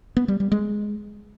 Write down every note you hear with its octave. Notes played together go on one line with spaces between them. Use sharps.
B3
G3
G3
G#3